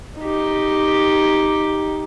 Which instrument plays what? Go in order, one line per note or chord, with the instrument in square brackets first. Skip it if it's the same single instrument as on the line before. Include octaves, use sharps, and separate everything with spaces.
[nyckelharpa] D#4 G4